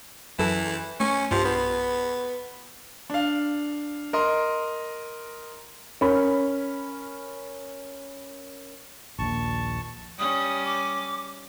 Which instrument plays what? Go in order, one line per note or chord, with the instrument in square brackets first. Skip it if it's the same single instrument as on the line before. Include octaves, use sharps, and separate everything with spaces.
[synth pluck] F#2 A4 [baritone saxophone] E3
[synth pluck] A3 [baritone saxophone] C#4
[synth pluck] B1 G2 G4 [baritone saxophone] F3
[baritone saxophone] B3
[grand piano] D4 F5
A#4 D#5 C6
[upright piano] C#4 A#4 B5
[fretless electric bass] A#1 D#2 A#2 [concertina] A5 C#6
[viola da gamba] G3 C#4 [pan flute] D#6
[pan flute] D6